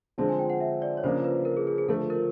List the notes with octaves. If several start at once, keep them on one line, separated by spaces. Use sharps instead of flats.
D3 F3 G#3 C4 A5
G#5
G5
F#5
E5
D5
C#5
C#3 F3 A#3 D4 C5
B4
A#4
G#4
G#4
G#4
D3 F3 A3 A4
A#4